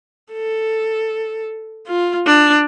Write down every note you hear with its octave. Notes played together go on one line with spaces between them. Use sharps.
A4
F4
D4